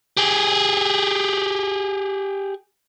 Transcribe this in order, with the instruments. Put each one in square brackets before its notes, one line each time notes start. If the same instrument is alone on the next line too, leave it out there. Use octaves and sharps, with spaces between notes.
[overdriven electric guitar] G4 G#4